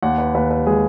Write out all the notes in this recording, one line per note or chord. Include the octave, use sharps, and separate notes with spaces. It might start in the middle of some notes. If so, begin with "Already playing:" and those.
D#2 F#5
B4
D#2 B4
B4
G#3 G#4